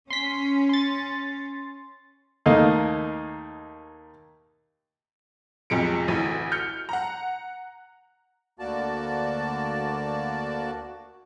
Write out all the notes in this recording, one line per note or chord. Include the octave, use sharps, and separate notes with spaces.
C#4 C6 B6
C6 A6
D#2 A3 A#3 D#4 D#5 F5
B1 F2 C3 G#3 C#7 D7
A1 D2 E4 D#7
F6 G6 C#7
F#5 A#5
D2 A#3 F#4 D5 A5